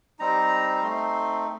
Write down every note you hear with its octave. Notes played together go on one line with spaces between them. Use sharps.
G3 C4 D#4 A#5
A#5
A3 C4 D#4 C6